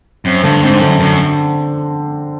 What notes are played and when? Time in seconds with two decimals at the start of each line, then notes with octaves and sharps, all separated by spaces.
0.25 F#2 C4
0.43 G2 D3
0.63 G#2 C4
0.81 F#2 D3
1.00 F#2 D3